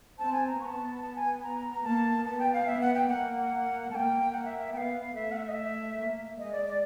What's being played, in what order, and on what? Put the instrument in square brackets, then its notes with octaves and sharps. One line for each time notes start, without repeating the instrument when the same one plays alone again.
[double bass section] C4 [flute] A5
[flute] G#5
A#5
[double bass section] B3 [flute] C#6
[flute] A5
A5
G#5
A#5
A#5
A#5
[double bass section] A#3 [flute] A5
[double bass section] B3 [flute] A5
[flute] G5
F5
[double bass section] B3 [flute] E5
[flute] F#5
G5
[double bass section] A#3 [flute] F#5
[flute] F#5
[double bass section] A#3 [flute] G5 A5
[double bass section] A#3 [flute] F#5
[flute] E5
E5
[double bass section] B3 [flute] F5 G5
[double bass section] A3 [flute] E5
[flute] F#5
E5
D#5
E5
[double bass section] A#3
[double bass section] G#3 [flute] D#5
[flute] D5
D5